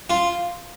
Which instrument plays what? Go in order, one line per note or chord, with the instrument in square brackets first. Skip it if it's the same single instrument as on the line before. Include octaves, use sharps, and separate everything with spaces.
[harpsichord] F4